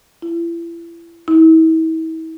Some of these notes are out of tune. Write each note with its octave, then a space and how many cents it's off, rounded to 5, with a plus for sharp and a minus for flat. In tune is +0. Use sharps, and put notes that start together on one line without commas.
E4 +35
E4 -40